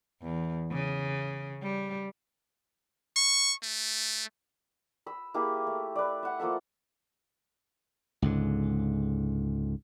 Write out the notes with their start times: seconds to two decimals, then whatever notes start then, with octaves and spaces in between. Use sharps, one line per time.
0.22 E2
0.71 C#3
1.62 G3
3.16 C#6
3.63 A3
5.06 B5 E6
5.34 A#3 E4 G4 G#4
5.67 A3
5.96 B4 D5
6.23 E5 F#5
6.39 F3 A#3 A4 E5
8.22 C#2 G#2 D3